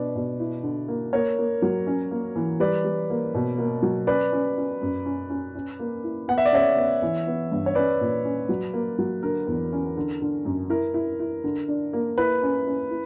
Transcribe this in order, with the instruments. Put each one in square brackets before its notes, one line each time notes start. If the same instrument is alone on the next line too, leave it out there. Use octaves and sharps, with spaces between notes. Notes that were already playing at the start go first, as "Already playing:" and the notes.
Already playing: [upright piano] B2 D4 [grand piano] B4 D5
[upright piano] B2
E4
D3
A#3
[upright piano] A#3 [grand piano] A#4 C#5
[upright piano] A#3
F#3
C#4
A#3
E3
[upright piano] G3 [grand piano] B4 D5
[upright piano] G3
A#3
B2
A#3
F#3
[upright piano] C#4 [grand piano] B4 D5
[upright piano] C#4
C#4
F#2
C#4
C#4
C#4
A#3
E4
[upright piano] B3 [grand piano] F#5
[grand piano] E5
D5
[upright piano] C#3 [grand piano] C#5 E5
[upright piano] B3
E3
B3
G2
[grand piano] C#5
[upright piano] C#4 [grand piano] B4 D5
[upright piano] A#2
C#4
F#3
A#3
F#3
[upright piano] D3 [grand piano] A#4
[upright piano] E2
C#4
D3
D3
F#2
[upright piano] E4 [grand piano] A#4
[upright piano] E4
E4
D3
D4
A#3
[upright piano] E4 [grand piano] B4
[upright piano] C#4
C#4
E4